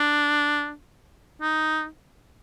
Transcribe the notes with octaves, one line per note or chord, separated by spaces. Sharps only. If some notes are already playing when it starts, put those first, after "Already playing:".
Already playing: D4
D#4